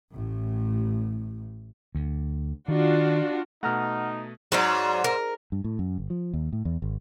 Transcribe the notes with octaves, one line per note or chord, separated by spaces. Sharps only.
A1 A2
D2
D#3 D4 F4 F#4
B2 A3 D#4 F#5 A#5 F6
G#2 F#3 C5 D5
A#4
G2
A2
F#2
G1
F3
D#2
A2
E2
G#1